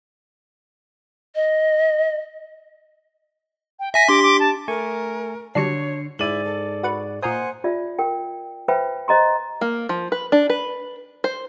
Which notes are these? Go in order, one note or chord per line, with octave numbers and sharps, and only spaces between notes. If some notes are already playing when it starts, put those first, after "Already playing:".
D#5
G5
E5 G#5 A#6 B6
D4 G4 C6 D6 B6
D6
A5
A3 A#4 G#5 C#6
D3 F#3 G3 D4 C#5 C7 C#7
G#2 E4 G#4 D5 D#7 F#7
A4
F#4 B4 C#6
A#2 A#4 C5 D#5 F#5 G#5 C6
F4 D5 E5
A#4 G5
B4 C5 E5 G5 B5
C5 D#5 A#5 C6
A#3
F3
B4
D4
B4
C5